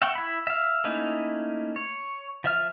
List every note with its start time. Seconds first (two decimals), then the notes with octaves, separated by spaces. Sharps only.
0.02 E5 F#5 G5 C#6
0.15 E4 B5
0.47 E5 F5
0.84 A3 A#3 C#4 D#4 E4
1.76 C#5
2.44 F3 E5 F6